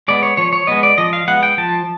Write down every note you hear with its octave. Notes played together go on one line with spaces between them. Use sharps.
G#3 B3 D5
C#5
F3 C#5
C#5
G#3 B3 D#5
D5
F3 D#5
F5
G#3 B3 F#5
G5
F3 A5